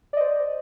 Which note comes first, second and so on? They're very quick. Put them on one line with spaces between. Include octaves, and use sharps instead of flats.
D5 D#5 C5